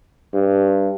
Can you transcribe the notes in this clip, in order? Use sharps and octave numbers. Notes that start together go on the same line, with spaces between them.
G2